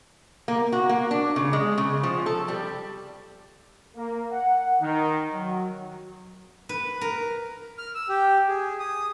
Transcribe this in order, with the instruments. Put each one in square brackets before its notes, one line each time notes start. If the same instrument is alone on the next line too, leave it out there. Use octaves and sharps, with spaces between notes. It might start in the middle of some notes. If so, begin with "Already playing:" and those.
[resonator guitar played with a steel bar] A#3
F#4
A#3
D4
C#3
G#3
C#3
F3
A4
G3
[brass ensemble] A#3
F#5
D#3
F#3
[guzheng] B4
A#4
[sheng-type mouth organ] F6
E6
G4
G#4
D#6